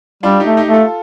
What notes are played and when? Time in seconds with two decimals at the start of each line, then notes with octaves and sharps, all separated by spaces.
0.23 G3 D4 F4
0.40 D#4 G4
0.46 A3
0.57 D#4 G4
0.68 A3
0.73 F4 A4